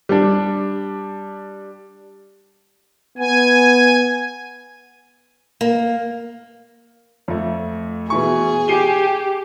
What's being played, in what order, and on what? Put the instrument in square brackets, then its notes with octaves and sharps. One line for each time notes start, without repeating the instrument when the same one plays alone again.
[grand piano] G3 D4
[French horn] B3 [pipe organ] G#5
[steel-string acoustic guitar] A#3
[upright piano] F2 A3
[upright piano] B2 E3 C#6 [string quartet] G#4
[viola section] G4 [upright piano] C7 D#7 G7